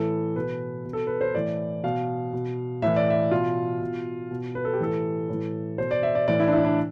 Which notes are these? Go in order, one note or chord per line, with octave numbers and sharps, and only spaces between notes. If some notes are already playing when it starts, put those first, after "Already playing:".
Already playing: A2 E3 A4
B2 B4
B2
A4
B4
C5
A2 E3 D5
B2 F5
B2
A2 E3 E5
D5
E5
B2 F4
B2
B2
B4
A4
G4
A2 E3 A4
A2 E3
B2 C5
D5
E5
D5
A2 E3 D5
E4
D4
E4
D4